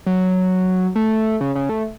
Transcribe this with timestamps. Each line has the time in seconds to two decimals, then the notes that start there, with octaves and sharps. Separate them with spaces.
0.06 F#3
0.96 A3
1.41 C#3
1.55 C#3
1.69 A3